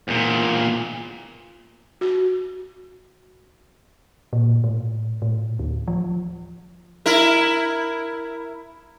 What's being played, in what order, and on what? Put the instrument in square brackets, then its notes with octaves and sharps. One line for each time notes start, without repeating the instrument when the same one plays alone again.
[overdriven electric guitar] E2 A#2
[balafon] F#4
[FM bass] A#2
A2
A2
D2
F3
[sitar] E4 A#4